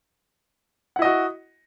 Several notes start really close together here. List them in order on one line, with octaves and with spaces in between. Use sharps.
F#5 E4 D#5 F#4